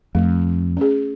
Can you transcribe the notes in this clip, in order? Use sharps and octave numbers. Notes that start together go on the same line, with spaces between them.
F2 A3
C#4 G#4